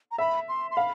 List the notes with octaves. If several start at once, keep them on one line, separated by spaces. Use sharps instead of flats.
A#5
E5 B5
C6
C6
F5 B5